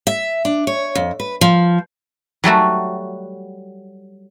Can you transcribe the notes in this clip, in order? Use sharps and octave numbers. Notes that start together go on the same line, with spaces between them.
E5
D4
C#5
F2
B4
F3
F#3 G3 A3 F#4